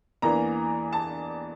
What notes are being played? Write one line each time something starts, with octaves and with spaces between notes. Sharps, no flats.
E2 E3 A#3 D4 A#5
A5